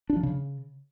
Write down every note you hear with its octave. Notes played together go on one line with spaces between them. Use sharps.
D4
F3
C#3